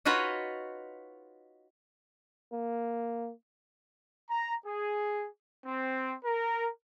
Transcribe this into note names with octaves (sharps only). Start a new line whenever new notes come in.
D#4 F4 F#4 B4 C#5 D#5
A#3
A#5
G#4
C4
A#4